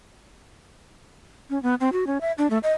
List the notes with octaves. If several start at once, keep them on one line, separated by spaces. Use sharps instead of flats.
C#4
B3
C4
F#4
C#4
E5
D4
A3
D#5